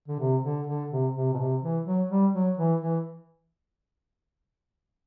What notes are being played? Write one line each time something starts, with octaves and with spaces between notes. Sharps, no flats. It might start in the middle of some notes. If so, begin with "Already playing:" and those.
D3
C3
D3
D3
C3
C3
B2
C3
E3
F#3
G3
F#3
E3
E3